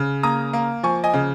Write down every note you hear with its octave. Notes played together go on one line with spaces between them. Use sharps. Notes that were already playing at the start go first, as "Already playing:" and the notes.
Already playing: C#3
A#3 A#5 D#6
A#3
F3 G#5 C#6
D#5 G#5
C#3